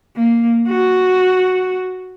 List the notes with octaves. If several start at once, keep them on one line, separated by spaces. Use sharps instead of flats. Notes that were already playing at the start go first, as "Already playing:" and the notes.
A#3
F#4